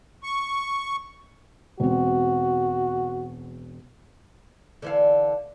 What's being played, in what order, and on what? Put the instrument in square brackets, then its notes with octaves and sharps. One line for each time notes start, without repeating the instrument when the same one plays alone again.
[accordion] C#6
[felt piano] E1 C4 [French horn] F#4
[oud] D3 E3 F5